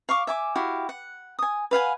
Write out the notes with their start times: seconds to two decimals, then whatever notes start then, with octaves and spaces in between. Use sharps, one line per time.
0.09 F5 C#6 D6
0.27 E5 G#5 D6
0.56 E4 F#4 G4 F5
0.89 F#5
1.39 G#5 D#6
1.71 B4 F5 F#5 G#5